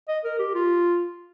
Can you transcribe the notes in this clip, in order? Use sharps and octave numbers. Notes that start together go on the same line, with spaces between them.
D#5
A#4
G4
F4